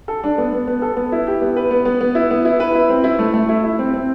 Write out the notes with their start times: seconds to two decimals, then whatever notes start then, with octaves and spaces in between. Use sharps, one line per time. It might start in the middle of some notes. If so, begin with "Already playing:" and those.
0.08 A4
0.24 D4
0.38 B3
0.52 B3
0.67 B3
0.82 A4
0.97 B3
1.12 E4
1.27 G4
1.42 B3
1.56 B4
1.71 B3
1.85 B3
2.01 B3
2.15 E4
2.31 B3
2.45 E4
2.60 B4
2.75 E4
2.89 C4
3.04 E4
3.19 A3
3.34 A3
3.49 E4
3.64 E4
3.79 C4
3.94 C4